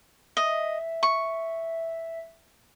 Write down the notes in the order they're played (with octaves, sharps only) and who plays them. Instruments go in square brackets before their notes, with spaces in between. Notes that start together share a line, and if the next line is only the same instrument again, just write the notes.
[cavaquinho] D#5 [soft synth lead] E5
[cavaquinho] C#6